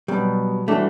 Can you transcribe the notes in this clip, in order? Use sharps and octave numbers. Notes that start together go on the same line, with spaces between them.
B2 F#3 G3 B3
E3 G3 A3 D4 F#4